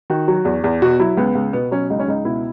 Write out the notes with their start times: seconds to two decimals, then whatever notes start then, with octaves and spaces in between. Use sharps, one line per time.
0.10 D#3 F#4
0.28 F#3
0.45 E2
0.64 E2
0.82 B2 F#4
0.99 F#3 E4
1.17 C#2 B3
1.35 C#2
1.53 B2 B3
1.71 F#3 C#4
1.90 C#2 D#4
1.99 C#4
2.08 C#2 D#4
2.25 B2 E4